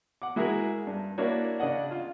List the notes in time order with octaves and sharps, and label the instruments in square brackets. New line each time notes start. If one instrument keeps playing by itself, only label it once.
[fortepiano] F#5 D6
G#3 E4 F#4 G#4 A#4
G2
A#3 D4 E4 F#4 C#5
C#3 D4 D#5 F#5
F4